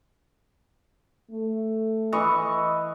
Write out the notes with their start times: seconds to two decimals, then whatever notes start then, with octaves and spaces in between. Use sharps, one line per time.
1.31 A3
2.12 E3 D#5 C#6